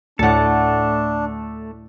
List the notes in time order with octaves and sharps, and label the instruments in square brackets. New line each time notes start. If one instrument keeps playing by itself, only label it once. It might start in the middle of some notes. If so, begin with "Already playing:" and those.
[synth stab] D2 A2 [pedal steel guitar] A3 A4 [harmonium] D4 [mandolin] F#5 A5